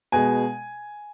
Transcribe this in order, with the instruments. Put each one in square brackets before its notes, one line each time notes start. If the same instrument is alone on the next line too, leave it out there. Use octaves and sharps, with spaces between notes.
[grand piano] B2 G#3 G#5